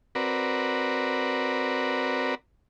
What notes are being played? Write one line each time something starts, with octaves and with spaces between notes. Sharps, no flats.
C4 F#4 A#4 B4 D5